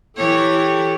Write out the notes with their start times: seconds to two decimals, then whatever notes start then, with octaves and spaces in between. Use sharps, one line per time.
0.17 E3 E4 G4 A4 C#5